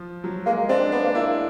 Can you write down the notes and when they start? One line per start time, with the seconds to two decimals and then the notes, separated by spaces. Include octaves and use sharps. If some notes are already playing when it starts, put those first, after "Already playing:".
Already playing: F3
0.24 F#3
0.46 G#3 A#3
0.69 C4 D4
0.92 B3 D4
1.04 A#3
1.15 A#3 E4